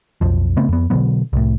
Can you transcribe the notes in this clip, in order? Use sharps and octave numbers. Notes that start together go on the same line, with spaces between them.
B1 F2 F3
C#3 A3 B3 C4
F2 B3
B2 D3 F#3 B3
C2 A2